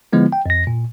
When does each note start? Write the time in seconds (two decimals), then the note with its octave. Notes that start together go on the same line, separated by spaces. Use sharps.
0.13 D3 F3 G#3 B3 E4
0.32 G5
0.46 F2 A#6
0.67 A#2